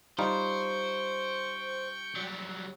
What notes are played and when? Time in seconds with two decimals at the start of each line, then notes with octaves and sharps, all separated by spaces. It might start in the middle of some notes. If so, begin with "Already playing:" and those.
0.19 G3 D#4 F4 C5 G5 C#6
2.16 F#3 G3